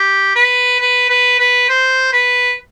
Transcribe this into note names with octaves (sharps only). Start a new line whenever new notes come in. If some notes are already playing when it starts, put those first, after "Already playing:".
Already playing: G4
B4
B4
B4
B4
C5
B4